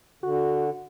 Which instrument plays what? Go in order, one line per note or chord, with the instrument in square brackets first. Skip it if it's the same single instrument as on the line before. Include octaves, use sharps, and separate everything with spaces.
[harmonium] D3 [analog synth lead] F#4